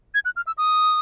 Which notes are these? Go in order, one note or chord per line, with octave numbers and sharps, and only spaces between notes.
G#6
F#6
F6
E6
D#6